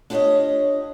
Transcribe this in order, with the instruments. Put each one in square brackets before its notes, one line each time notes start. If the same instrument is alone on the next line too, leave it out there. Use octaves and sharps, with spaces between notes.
[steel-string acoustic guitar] D4 F4 G4 C5 C#5 D#5